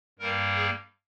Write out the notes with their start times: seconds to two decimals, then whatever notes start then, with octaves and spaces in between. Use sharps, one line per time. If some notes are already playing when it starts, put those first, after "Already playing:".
0.19 G2 G3 A#3 A#4
0.55 G#4